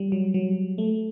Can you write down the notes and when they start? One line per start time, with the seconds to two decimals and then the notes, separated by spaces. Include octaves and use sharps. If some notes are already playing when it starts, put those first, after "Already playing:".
Already playing: G3
0.12 F#3
0.34 F#3
0.78 A3